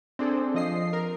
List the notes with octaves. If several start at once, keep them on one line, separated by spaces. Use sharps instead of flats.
C4 D4 G#4 A4
F3 D#5 C7
A#4